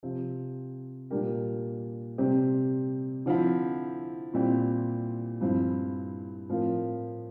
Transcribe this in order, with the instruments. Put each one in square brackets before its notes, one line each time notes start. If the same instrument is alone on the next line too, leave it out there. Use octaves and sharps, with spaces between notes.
[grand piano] C3 F3 C4
A#2 G3 D4 G4 A#4
C3 G3 C4 G4
D3 F3 C4 E4
A#2 G3 C4 E4 G4
G2 F3 C4 E4
A2 F3 C4 F4 A#4